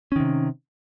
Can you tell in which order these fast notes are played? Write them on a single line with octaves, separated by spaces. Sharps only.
C#4 D#3 C3